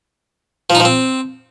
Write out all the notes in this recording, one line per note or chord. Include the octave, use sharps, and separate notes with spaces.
F3
D#4
F3
C4